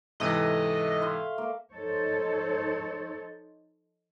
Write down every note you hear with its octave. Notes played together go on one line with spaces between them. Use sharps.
G#2 C3 E3 A3 D#5
E5 F5 C6
A#3
F3 D#4 A4 C5 C#5